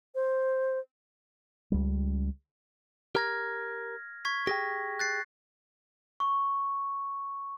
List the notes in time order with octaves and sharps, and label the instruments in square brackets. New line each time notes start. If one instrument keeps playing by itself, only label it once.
[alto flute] C5
[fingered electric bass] C#2 G3
[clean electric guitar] G4 A#4 A#5 [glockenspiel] F6 G#6 A#6
[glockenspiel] C#6 G#6 B6
[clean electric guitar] G4 G#4 G5 [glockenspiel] A#6
[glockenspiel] F#6 A6 C7
C#6